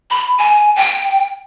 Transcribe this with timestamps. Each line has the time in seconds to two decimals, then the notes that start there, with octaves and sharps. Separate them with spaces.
0.10 B5
0.38 G#5
0.76 G5